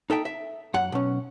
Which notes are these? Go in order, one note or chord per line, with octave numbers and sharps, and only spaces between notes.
D#4 A4 E5 G5
E5
F#2 F#5
B1 C#4